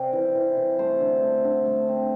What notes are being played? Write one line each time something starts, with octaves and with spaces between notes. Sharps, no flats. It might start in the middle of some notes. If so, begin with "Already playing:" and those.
Already playing: C3 C4 D5
E3
E3
E3
A3 C5
D3
A3
D3
A3
C4